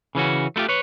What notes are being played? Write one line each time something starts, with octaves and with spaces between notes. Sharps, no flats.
C#3 E3 C#4 F#4
A3 E4 F4 G4
B4 C#5